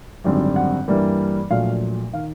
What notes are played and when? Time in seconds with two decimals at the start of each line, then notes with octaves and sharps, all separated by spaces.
0.24 G#1 F#2 D3 G3 C4
0.56 F#5
0.88 G2 E3 G3 A#3
1.50 A#1 A#2 F#3 A3 F5
2.13 D#3 F5